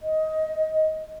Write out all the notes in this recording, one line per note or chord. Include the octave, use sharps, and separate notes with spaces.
D#5